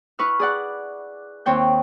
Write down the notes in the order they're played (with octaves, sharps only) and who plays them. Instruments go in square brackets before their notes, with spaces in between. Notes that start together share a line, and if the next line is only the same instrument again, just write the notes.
[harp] E4 B4 C#6 F6
G#4 D5 F#5
D#2 C4 C#5 G5 G6